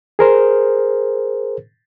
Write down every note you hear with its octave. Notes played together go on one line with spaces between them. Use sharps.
G#4 A#4 C5